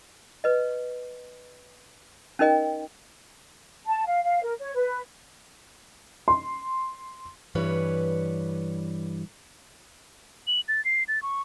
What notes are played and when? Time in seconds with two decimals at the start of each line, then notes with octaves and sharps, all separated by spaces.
0.44 B4 D#5
2.39 C#4 D#4 A#4 D#5 G5
3.86 A5
4.06 F5
4.24 F5
4.43 A#4
4.60 C#5
4.75 B4
6.28 C6
7.55 G2 E3 G3 B4 C#5
10.47 F#7
10.68 A6
10.85 C7
11.08 A6
11.22 C#6